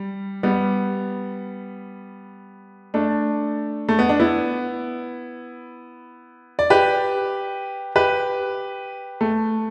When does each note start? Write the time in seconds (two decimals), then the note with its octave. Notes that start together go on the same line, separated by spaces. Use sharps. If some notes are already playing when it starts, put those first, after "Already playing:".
Already playing: G3
0.43 G3 B3
2.94 A3 D4
3.89 A3
3.99 B3
4.09 D4
4.20 B3 E4
6.59 D5
6.70 G4 B4
7.96 G4 B4
9.21 A3